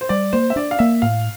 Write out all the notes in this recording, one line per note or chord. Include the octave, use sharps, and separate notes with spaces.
C5
G3 D5
A#3 C5
E5
D4 D5
F5
A#3 E5
A2 F5